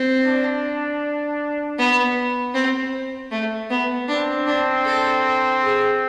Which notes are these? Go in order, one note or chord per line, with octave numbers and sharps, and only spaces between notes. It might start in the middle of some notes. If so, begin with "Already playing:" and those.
Already playing: C4
D4
B3
C4
A3
B3
C4 D4
D4
A4
G#4